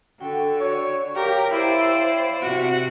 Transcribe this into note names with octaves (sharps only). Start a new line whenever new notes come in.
D3 F#4 A4 G5
F#4 C#5 D5
G4 A#4 C#5 F5 G5
E4 C5 D5
C3 F#4